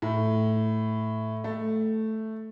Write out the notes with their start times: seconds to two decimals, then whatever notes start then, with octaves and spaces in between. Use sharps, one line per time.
0.02 A2
1.44 A3